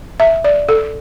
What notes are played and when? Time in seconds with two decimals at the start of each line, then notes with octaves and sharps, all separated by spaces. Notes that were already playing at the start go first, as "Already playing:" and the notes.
0.20 E5
0.44 D5
0.69 A4